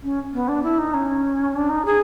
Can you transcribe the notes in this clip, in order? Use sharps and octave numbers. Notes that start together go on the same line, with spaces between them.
C#4
B3
D4
E4
D#4
C#4
D4
D#4
G#4